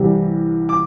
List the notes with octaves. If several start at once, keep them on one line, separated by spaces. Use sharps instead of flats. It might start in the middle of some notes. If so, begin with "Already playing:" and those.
Already playing: C2 C3 E3 G3
D6